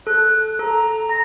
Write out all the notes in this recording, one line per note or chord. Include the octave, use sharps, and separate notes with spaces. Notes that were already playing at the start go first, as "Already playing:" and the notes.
A4 F#6
A4 A#5
A#5 A#6